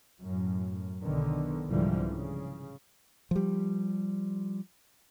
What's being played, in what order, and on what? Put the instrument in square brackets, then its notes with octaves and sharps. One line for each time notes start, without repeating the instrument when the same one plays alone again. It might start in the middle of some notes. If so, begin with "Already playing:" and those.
[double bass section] F#2 A2
B1 D3 D#3 B3
C2 G#2 D3 E3 F3 G3
C#3
[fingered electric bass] F3 G3